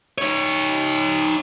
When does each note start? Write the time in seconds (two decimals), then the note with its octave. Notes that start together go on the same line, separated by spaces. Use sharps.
0.18 D#4 C#5